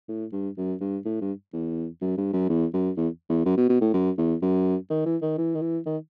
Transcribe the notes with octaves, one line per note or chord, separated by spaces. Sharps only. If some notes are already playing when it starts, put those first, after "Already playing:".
A2
G2
F#2
G2
A2
G2
E2
F#2
G2
F#2
E2
F#2
E2
E2
F#2
B2
B2
A2
F#2
E2
F#2
D#3
E3
D#3
E3
D#3
E3
D#3